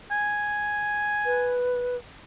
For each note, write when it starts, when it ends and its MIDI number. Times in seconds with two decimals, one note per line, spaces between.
0.11 1.55 80
1.26 1.96 71